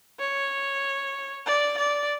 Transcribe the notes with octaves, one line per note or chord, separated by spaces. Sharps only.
C#5
D5
D5